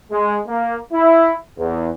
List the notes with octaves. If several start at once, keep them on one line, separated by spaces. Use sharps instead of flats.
G#3
A#3
E4
E2